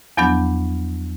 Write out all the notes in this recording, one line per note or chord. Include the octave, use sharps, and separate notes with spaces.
E2 F3 F#3 B3 D4 G6